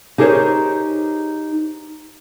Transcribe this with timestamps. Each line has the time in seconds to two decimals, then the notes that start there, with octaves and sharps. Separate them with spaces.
0.18 D#4 G4 G#4 A#4 C5 C#5